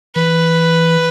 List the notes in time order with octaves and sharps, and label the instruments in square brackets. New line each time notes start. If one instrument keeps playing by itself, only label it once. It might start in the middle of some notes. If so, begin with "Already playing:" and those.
[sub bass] E3 [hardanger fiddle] B4